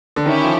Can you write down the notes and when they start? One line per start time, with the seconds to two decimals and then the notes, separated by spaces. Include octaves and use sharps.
0.16 D3
0.25 D#3 C#4 E4 G4
0.44 F3